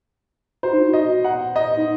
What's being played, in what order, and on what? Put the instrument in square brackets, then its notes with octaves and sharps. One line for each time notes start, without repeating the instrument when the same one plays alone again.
[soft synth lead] F#4 [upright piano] C5
[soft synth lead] D#4
F#4
[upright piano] D#5
F#5
D#5
[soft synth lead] D#4